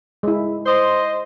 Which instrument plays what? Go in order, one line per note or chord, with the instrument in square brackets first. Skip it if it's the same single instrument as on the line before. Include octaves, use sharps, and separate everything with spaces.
[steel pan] G#3 E4
[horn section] C5 D#5